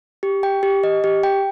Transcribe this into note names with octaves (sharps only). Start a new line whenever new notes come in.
G4
G5
G4
D#5
G4
G5